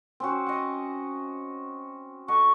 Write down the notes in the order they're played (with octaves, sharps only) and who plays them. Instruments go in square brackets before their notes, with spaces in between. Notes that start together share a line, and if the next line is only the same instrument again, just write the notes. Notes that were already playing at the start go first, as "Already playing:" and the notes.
[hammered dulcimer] C4 C#4 F#4
D#5 F#5
[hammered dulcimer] A4 D#5 F#5 [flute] C#6